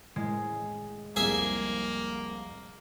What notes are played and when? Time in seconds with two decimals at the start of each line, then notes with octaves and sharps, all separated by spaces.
0.16 A2 G#3
1.16 C2 F2 A#3 G#4 E5 G#5